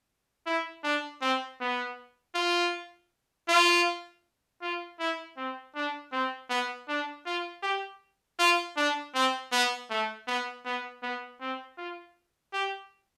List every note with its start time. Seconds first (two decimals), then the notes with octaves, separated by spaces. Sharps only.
0.46 E4
0.84 D4
1.22 C4
1.60 B3
2.35 F4
3.48 F4
4.62 F4
4.99 E4
5.37 C4
5.75 D4
6.12 C4
6.49 B3
6.88 D4
7.26 F4
7.63 G4
8.39 F4
8.77 D4
9.15 C4
9.52 B3
9.90 A3
10.27 B3
10.65 B3
11.03 B3
11.41 C4
11.77 F4
12.53 G4